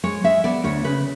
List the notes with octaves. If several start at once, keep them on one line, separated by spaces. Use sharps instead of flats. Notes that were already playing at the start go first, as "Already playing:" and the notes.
G#3 C#5
G#3 E5
B3 D5
D2 C#5
C#3 B4